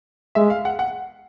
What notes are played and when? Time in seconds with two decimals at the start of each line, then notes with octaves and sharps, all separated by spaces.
0.35 G#3 E5
0.50 F5
0.65 F#5
0.79 F#5